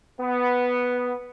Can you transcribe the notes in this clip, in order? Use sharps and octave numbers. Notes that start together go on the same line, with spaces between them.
B3